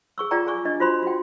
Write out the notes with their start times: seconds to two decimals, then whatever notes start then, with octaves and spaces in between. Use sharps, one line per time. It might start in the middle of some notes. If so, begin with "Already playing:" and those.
0.18 G#4 C#6 E6
0.31 F4 G#4 D5 G5 A#5
0.47 G#4 G#5 C#6 D6
0.65 D4 D#5
0.80 F4 F#4 C5 B5 C6
1.03 F#4 G5